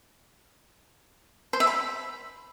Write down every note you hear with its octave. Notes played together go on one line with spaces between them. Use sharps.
C5
E5
B5